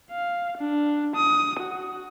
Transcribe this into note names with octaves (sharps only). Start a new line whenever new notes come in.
F5
D4
D#6
F#4